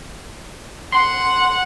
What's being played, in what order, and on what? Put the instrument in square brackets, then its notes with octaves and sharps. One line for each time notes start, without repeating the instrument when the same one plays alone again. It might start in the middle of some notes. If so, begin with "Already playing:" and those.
[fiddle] F#5 [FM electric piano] C6